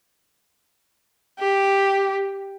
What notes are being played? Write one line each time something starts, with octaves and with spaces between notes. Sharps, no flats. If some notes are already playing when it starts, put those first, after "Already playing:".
G4